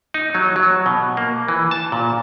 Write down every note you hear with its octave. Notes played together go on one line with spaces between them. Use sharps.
D#4
F#3
F#3
B2
A#3
E3
A5
A#2